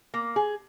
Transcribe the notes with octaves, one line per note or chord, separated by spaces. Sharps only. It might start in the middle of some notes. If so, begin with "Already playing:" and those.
A#3
G#4